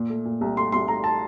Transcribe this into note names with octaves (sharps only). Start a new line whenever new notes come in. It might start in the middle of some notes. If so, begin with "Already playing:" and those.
Already playing: A#2
A3
A#2
C2
A3 C6
C2 C6
A3 A#5
A5